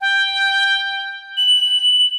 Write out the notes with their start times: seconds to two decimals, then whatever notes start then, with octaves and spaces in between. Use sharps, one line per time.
0.01 G5
1.37 F#7